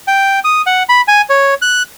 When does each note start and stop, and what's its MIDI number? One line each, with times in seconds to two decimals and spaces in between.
0.08 0.40 79
0.44 0.62 87
0.67 0.83 78
0.89 1.01 83
1.08 1.22 80
1.29 1.54 73
1.62 1.83 90